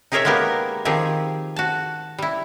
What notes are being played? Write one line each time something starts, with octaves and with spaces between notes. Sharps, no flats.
D#4 G4 G#4 A#4 C#5 E5
G#3 A#3 B3 G4 A#4
D#3 F3 C4 G4 G#4 G#5
F#4 A5
G3 E4